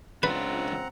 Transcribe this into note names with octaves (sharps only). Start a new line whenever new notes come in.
C#2 C4 D4 F4 B4 F#5 A#5